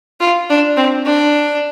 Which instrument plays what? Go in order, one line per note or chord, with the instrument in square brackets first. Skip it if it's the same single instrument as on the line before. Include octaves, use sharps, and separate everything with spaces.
[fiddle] F4
D4
C4
D4